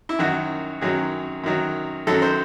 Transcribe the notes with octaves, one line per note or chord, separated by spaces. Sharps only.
E4
F#2 D#3 F#3 F#4
F#2 D#3 F#3 G#4
F#2 D#3 F#3
F#2 D#3 F#3 A4
C5